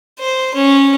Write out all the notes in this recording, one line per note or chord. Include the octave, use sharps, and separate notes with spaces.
C5
C#4